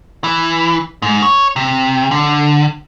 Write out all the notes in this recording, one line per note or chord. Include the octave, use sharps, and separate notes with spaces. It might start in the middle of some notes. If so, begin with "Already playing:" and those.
E3
G#2
C#5
C3
D3